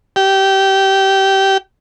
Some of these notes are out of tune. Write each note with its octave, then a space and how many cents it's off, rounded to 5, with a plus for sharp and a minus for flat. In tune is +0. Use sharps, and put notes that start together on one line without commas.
G4 -20